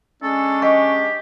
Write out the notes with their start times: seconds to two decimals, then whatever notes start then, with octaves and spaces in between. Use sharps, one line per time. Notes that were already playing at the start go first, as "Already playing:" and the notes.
0.22 G#3 C#4 D4 A4
0.62 G4 D#5 F#5 C#6